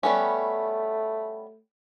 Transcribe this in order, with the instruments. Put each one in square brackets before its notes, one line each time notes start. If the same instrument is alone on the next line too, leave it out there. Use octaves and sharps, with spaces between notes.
[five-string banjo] G3 B3 C#4 [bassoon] A3